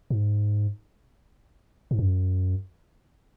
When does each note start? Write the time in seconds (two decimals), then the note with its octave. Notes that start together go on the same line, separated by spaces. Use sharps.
0.10 G#2
1.91 G#2
1.99 F#2